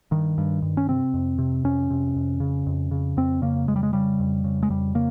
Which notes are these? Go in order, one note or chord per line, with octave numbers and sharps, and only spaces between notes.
G2 D#3
G2
G2
C#4
C3 C4
F2
C3
F2 C#4
C3
F2
C#3
F2
C#3
F2 C4
C#3 A#3
F2 G#3
G3
G#3
C#3 G3
F2
C#3
G#3
F2 G3
C#3 A#3